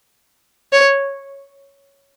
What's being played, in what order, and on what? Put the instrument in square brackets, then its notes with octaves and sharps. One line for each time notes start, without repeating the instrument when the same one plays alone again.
[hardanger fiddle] C#5